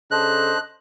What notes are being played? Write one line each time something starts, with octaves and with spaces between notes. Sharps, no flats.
C#3 D4 A4 C5 D#5 F#6